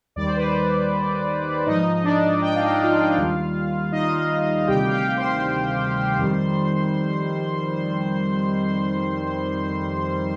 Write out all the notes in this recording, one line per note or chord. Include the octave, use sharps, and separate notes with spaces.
D#2 D#3 G3 D5
C5
B4
C5
G#2 F3 D#4 D#5
D4 D5
G5
F5
D#5
F4 F5
D#2 D#3 G3
D#4 D#5
D2 C3 D#3 G3 G4 G5
F5
G4 G5
C5 C6
F2 D#3 G3